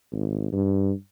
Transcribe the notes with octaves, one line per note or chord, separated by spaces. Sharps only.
G#1
G2